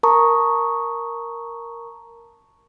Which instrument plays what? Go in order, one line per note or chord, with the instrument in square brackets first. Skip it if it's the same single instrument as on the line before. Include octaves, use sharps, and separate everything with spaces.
[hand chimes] A#4 A5 A#5 C#6 D#6